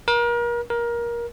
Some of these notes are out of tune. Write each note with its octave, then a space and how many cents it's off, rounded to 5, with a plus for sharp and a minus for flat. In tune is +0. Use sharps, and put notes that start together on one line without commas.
A#4 +35
A#4 +20